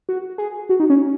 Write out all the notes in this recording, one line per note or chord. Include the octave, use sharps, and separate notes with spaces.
F#4
G#4
F#4
D#4
C#4